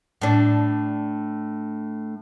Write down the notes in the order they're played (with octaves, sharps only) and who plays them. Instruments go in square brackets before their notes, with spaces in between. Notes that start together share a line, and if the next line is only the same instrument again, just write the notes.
[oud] A2 D4